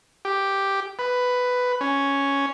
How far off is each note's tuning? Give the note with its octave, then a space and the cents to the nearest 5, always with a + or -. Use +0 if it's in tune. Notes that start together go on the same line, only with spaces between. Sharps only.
G4 +0
B4 +10
C#4 +0